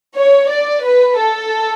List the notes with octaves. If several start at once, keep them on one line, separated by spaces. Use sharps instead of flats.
C#5
D5
B4
A4